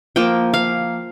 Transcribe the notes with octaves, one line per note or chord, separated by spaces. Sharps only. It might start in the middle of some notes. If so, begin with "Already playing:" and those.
F3 A#3 G5
F5